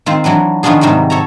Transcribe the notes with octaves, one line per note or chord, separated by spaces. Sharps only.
D#3 C4 F4
E3 F#3 D4 B4
D#3 F3 B3 C#4 D4 G#4
G#2 C3 D#3 F#3 G3
A4 C#5 E5 A#5